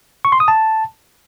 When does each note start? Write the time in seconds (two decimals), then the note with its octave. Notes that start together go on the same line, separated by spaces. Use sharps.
0.25 C#6
0.32 C6
0.40 D#6
0.48 A5